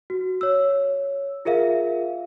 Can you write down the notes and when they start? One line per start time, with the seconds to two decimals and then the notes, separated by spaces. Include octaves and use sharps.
0.10 F#4
0.41 C#5 E6
1.45 F4 G#4 A#4 E5 F5